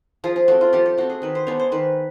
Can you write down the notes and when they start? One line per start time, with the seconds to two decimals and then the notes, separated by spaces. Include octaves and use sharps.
0.24 F3 G#4
0.36 G#4
0.48 A3 C4 F#4
0.61 F4
0.73 F3 G4
0.86 G4
0.97 A3 C4 F#4
1.10 G#4
1.22 D#3 B4
1.35 C5
1.47 G#3 B3 D4 C#5
1.60 C5
1.72 D#3 B4